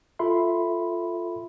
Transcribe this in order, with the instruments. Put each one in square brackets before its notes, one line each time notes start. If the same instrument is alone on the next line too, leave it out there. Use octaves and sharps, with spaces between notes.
[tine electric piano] F4 A4 E5 B5 C6